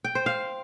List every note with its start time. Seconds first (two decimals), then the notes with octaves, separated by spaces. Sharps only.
0.04 G5
0.15 C5
0.26 F5